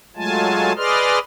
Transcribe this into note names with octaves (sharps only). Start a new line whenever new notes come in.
F#3 G#3 A3 F4 G#5 A5
G#4 B4 D5 D#5 C6 F6